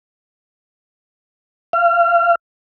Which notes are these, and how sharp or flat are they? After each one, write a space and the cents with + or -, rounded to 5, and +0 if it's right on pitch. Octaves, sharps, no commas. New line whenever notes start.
F5 -30